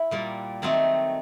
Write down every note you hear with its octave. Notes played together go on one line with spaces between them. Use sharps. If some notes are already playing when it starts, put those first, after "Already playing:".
Already playing: E4
A#2 G3 A#3
D#3 F#3 A3 C4 D#4